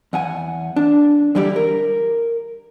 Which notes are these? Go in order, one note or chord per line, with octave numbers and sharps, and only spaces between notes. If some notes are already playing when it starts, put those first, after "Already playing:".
E2 F#5 G#5
D4
D3 E3 G3 E4 G4
A#4